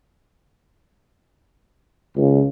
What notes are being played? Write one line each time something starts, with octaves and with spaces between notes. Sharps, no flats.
C#2